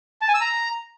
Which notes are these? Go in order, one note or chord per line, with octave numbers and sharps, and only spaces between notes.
A5
G#5
E6
A#5